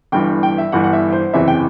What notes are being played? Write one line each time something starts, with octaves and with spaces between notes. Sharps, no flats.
G1 G2 E3 G5
G5
E5
G1 G2 E3 F#5
F#5
E5
C5
F#1 E2 C3 E3 E5
G5